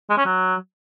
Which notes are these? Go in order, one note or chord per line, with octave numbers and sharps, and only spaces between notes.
G#3
C#4
F#3